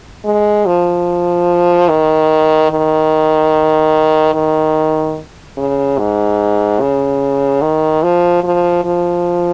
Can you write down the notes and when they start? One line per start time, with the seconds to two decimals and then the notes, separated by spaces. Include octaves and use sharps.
0.25 G#3
0.66 F3
1.89 D#3
2.71 D#3
4.34 D#3
5.58 C#3
5.98 G#2
6.80 C#3
7.62 D#3
8.03 F3
8.44 F3
8.84 F3